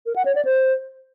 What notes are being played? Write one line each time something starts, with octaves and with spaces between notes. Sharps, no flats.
A#4
F#5
C#5
D5
C5